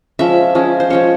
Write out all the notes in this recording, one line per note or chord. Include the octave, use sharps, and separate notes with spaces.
F3 G#3 C#4 E5
F3 G#3 C#4
C5
F3 G#3 C#4 C#5